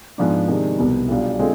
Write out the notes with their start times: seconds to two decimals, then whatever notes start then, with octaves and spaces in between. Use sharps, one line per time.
0.18 G#2 F3 B3 D4
0.48 C3 D#3 G#3 D4
0.78 C2 B2 B3
1.08 B1 B2 G3 D4 F4
1.39 D3 G#3 C4 F4